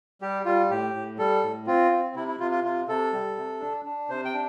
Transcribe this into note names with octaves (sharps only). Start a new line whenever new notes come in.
G3 G4
G3 F4
A2 G4
A2
G3 A4
A2
C4 F4
C4
C3 E4
E4
C3 F4
F4
C3 F4
C3 A4
G3
C3
D4
D4
C3 C5
G5
D4